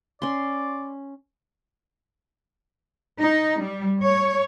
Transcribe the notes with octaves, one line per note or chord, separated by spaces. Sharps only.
C#4 D5 C6
D#4
G3
C#5